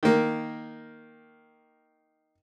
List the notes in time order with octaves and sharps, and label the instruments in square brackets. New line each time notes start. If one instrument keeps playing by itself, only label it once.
[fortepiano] D#3 A#3